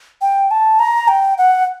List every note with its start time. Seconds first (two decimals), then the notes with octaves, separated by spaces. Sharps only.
0.22 G5
0.51 A5
0.79 A#5
1.08 G5
1.38 F#5